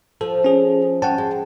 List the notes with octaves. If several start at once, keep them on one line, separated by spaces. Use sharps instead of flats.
F3 A4
C#4 G#4
C#4 F#5 G5 A5
G#3